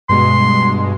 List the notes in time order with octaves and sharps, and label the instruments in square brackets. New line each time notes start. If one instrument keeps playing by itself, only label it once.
[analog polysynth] G2 B2 G#3 [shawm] C6